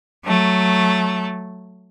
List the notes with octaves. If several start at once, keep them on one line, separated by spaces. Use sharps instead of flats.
F#3 A3